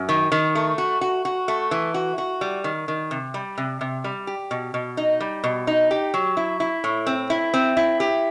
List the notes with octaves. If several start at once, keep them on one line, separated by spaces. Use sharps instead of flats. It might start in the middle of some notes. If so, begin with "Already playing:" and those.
Already playing: F#2
D#3
D#3
A3
F#4
F#4
F#4
A3
E3
F#4
F#4
G3
D#3
D#3
C3
G3
C3
C3
G3
G4
B2
B2
D#4
G3
B2
D#4
G4
F#3
E4
E4
A2
C4
E4
C4
E4
G4